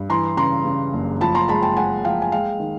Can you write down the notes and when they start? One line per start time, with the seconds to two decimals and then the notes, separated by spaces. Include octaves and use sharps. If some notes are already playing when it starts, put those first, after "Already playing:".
Already playing: G2
0.09 E3 A#5 C6
0.37 C#3 A#5 C6
0.65 C#3
0.93 F#1
1.21 F3 A5 B5
1.35 A#5 C6
1.48 G#3 A5 B5
1.63 G5 A5
1.77 G#3 F#5 G#5
2.04 F3 F5 G5
2.22 G#5
2.32 G#3 F5 G5
2.60 D#3